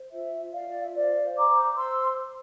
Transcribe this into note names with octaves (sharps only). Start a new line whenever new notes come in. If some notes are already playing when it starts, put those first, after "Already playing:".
Already playing: C5
F4 E5
F4
D5 F5
F4 D5
E5
C5 D5 F5
C5
A#5 D6
C5
C5 C6 E6